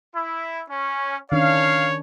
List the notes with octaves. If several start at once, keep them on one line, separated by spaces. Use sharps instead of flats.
E4
C#4
D#3 C#4 D4 C#5 F5